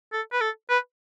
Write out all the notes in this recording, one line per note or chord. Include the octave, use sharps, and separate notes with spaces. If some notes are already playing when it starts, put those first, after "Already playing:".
A4
B4
A4
B4